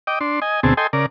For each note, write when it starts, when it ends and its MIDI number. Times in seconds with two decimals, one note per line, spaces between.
0.07 0.19 75
0.07 0.19 79
0.07 0.19 86
0.21 0.40 62
0.21 0.40 84
0.42 0.60 75
0.42 0.60 80
0.63 0.74 38
0.63 0.74 47
0.63 0.74 60
0.63 0.74 68
0.63 0.74 81
0.77 0.87 69
0.77 0.87 75
0.77 0.87 79
0.77 0.87 80
0.77 0.87 84
0.93 1.06 49
0.93 1.06 70
0.93 1.06 74